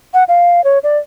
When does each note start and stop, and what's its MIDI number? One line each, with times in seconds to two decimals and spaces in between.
0.14 0.24 78
0.28 0.64 77
0.64 0.79 73
0.83 0.98 74